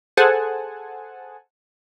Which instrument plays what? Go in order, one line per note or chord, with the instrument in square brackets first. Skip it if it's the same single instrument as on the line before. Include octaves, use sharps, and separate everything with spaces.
[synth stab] G#4 A4 C5 F#5 G#5 A5